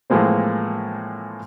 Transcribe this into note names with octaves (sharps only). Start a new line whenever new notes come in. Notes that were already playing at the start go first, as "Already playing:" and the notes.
A2 E3 F3 G#3 A#3 C4